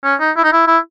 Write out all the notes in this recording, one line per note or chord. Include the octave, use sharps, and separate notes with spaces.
C#4
D#4
E4
D#4
E4
E4